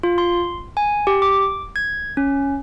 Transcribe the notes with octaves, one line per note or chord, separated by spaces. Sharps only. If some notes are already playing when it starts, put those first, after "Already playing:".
F4
C6
G#5
G4
D6
G#6
C#4